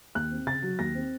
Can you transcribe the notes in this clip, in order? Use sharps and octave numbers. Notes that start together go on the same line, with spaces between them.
D#2 F#6
C4
C#3 A6
F#3
D#2 A#6
C4